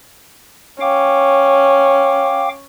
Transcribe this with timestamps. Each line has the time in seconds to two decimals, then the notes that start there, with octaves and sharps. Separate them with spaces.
0.81 C#4 F5 G5 D6